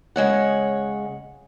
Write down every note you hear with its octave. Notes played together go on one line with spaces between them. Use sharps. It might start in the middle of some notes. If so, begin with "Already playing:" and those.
C#3 G#3 C#5 F#5